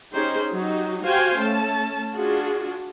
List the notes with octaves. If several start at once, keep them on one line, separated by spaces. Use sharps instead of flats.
C#4 D#4 G4 G#4 C5
F#3 D#4 F#4 G4
F#4 G4 C5 F5 G5 G#5
A3 C#4 A5
D4 F4 F#4 G#4